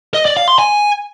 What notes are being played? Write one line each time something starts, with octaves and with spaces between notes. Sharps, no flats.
D#5
D5
F5
C6
G#5